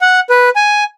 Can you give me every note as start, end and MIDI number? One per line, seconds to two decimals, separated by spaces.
0.01 0.20 78
0.30 0.49 71
0.56 0.84 80